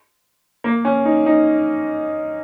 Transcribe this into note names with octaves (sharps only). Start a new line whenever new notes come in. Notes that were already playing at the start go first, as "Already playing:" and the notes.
A#3
C#4
D#4
D#4